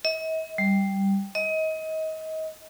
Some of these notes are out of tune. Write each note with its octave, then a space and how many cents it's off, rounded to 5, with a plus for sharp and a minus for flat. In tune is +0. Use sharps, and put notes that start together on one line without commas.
D#5 +45
G3 +0
D#5 +30